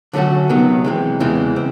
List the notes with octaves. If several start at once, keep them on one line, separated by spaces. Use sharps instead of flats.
D3 F#3 A3 C#4 F#4
C3 D#3 F#3 B3
C3 E3 G#3
E2 C#3 E3 G#3 C4
C4